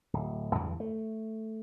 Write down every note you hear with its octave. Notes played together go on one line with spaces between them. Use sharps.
D1
E2 G2 D3 E3
A3